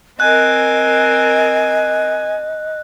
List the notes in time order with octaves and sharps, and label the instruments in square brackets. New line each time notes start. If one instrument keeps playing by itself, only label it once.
[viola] C4 A#4 [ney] D#5 [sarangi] G#5 [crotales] F#6